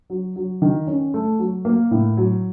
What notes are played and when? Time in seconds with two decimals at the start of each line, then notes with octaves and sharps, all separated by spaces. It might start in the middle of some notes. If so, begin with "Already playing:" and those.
0.10 F#3
0.36 F#3
0.62 D#3
0.87 C#4
1.14 A3
1.39 F#3
1.65 A#3
1.91 A2
2.17 F#3